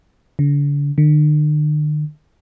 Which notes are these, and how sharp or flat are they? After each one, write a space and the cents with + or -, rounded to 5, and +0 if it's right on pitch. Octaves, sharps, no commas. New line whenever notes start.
D3 -40
D3 +45